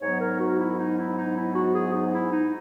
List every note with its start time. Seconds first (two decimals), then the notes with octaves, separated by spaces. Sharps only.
0.01 G#2 F#3 B3 D#4 C#5
0.20 A#4
0.40 F#4
0.59 E4
0.78 D#4
0.98 E4
1.17 D#4
1.36 E4
1.55 F#4
1.75 G#4
1.94 D#4
2.13 E4
2.32 D#4